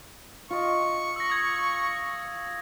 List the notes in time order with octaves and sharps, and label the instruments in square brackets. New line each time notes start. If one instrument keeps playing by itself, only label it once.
[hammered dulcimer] F4 D#5 [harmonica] C#6
[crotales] E6 A#6
D#6 G#6